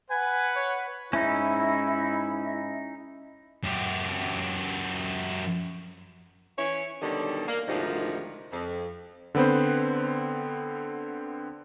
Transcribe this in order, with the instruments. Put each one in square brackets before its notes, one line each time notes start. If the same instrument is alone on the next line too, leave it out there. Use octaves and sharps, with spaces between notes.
[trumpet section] B4 F#5 [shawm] G#5
[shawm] C#5
[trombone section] G#2 E4 [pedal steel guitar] C#4 D#4
[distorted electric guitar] F#2 G4
[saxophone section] E3 C#4 E4 C#5
B2 D3 D#3 F#3 G3
A#3
D2 G#2 C3 D#3 F3 G3
F2
[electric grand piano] D3 B3 C4 B4 C5